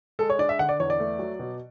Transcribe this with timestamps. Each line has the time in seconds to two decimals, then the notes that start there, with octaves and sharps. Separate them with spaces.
0.19 G#3 A4
0.30 C#5
0.38 D4 D5
0.49 E5
0.59 D3 F#5
0.69 D5
0.80 E2 C#5
0.90 D5
1.00 A3
1.19 F#3
1.39 B2